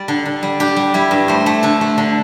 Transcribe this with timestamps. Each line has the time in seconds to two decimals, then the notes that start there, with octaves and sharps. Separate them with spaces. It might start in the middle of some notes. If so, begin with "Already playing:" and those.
Already playing: G3 D5
0.08 D3
0.25 D3
0.43 G3
0.60 D4 G4
0.76 G3
0.94 G3 E4
1.11 G2
1.28 A3 C5
1.46 A3
1.63 D3 A4
1.81 A3
1.98 D3